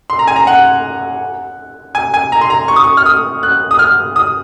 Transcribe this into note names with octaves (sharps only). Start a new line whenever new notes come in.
C6
A#5
G#5
A#5
F#5
G#5
G#5
A#5
C6
A#5
C#6
D#6
C#6
F6
D#6
F#6
D#6
F6
D#6